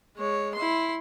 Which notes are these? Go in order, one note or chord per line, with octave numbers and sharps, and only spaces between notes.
G#3 C#5
E4 C6